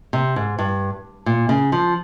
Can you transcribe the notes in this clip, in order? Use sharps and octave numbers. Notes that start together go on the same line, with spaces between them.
C3
G#2
G2
A#2
C#3
F3